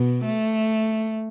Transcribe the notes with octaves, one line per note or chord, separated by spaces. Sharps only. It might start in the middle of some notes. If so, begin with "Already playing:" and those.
Already playing: B2
A3